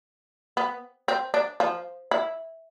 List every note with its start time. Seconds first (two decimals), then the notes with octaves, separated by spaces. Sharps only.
0.57 B3
1.08 C4
1.34 D4
1.60 F3
2.11 E4